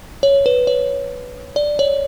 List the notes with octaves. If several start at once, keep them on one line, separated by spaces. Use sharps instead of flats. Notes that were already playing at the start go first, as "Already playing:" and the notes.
C#5
B4
C#5
D5
C#5